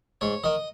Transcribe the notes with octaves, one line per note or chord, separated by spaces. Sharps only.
G#2 C#5
D#3 D#5